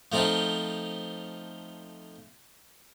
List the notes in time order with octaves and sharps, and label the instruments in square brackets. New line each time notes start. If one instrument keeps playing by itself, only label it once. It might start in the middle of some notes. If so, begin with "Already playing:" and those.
[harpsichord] F3 A3 C4 D#4 F4